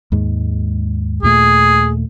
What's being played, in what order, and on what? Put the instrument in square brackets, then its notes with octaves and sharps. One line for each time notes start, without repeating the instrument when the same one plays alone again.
[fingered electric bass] D#2 G#2 G#3
[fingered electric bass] D#2 A#2 A3 [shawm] G#4